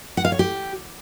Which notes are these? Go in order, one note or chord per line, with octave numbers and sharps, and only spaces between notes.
F#5
F5
C#5
G4